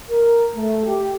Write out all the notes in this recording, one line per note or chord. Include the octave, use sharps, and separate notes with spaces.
A#4
A3
G4